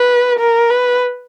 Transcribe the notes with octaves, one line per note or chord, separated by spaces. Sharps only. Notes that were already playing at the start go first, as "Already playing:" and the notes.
Already playing: B4
A#4
B4